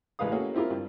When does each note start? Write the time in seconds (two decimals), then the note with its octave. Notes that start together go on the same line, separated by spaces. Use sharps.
0.19 A1 G#3 B4 F5 D#6
0.32 A3 A#3 C#4 F#4 G#4
0.55 C4 E4 F4 G4 A#4
0.70 G2